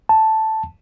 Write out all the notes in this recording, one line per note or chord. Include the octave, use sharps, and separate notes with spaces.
A5